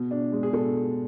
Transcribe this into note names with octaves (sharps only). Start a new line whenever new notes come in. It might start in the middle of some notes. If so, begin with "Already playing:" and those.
Already playing: B2
D4
G#3
G#4
B2 A4